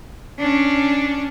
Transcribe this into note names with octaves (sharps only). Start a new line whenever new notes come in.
C#4 D4